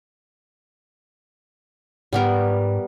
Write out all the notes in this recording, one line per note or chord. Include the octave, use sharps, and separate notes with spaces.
G#2 G3 B3 A#4